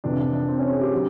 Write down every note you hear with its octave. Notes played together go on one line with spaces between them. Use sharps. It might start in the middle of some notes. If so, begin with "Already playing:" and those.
F2 C3 E3 D4
D4
D4
C4
C#4
G#4
G4
D3 F#3